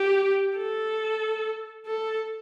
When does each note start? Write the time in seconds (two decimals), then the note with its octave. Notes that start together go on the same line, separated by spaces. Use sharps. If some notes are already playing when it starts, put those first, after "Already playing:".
Already playing: G4
0.58 A4
1.86 A4